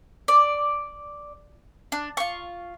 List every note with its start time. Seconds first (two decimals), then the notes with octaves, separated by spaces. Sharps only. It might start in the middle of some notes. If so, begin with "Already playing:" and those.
0.28 D5
1.92 D4
2.17 F4 C#6